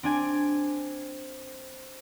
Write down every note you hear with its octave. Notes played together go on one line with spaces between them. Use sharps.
C4 D4 G#5